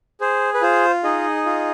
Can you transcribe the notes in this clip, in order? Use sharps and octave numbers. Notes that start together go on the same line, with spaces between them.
G#4 C5
B4
F4 C5
D#4 G#4 D#5
F4